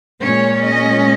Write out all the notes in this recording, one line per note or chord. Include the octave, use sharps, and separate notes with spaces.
A#2 G#3 C#4 C#5
D#5